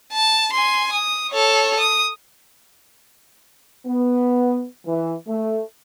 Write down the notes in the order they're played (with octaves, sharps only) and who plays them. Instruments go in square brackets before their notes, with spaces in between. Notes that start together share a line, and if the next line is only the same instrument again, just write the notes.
[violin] A5
G#5 C6
D#6
A4 C#5
D#6
[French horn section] B3
E3
A3